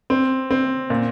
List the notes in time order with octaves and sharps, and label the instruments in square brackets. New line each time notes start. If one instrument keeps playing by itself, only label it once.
[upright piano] C4
C4
A#2